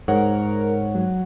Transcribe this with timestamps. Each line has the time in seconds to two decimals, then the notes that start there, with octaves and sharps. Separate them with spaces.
0.08 G#2 A#4 C#5 F#5
0.95 F#3